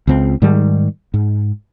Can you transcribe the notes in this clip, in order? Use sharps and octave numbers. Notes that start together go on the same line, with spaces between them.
C#2 C4
G#2 D#3 G3
G#2